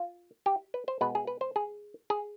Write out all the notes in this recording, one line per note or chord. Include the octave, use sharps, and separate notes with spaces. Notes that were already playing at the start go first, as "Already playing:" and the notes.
Already playing: F4
G4
B4
C5
B2 G#3 B3 B4
G#4
B4
C5
G#4
G#4